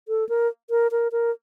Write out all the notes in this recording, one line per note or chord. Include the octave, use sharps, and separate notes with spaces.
A4
A#4
A#4
A#4
A#4